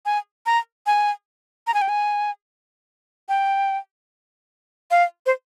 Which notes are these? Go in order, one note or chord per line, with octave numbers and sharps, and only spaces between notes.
G#5
A#5
G#5
A#5
G#5
G5
G#5
G5
F5
C5